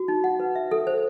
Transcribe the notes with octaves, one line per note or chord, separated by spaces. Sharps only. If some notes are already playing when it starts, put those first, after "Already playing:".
Already playing: F#4
D#4
F#5
B4
E5
A4
C5